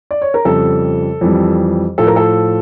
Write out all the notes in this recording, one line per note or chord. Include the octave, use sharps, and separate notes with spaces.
D5
C#5
A#4
F2 C#3 G3 A4
F2 E3 G3
A2 F3 A4
A#4
A4